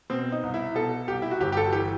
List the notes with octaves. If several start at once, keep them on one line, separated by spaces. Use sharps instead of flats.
B2 C4
D#4
C2
E4
B2 A4
C2 G4
E4
F#4
G1 G4
G4
A4
E3 G4